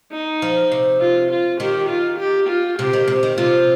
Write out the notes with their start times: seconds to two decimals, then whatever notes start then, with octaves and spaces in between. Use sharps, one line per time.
0.12 D#4
0.42 F3
0.72 C3
1.01 F4
1.31 F4
1.60 D#3 G4
1.90 F4
2.19 G4
2.49 F4
2.79 C3 G4
2.93 D#3
3.08 C3
3.23 D#3
3.38 C3 F4